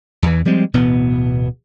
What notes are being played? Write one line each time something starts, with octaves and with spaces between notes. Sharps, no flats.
E2 E3
F3 G3 G#3 C4
D1 B2 E3 B3